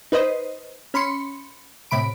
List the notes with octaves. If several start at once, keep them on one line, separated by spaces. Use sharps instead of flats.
D#4 B4 C5 D#5
C#4 B5 C6 C#7
A2 C3 B5 D7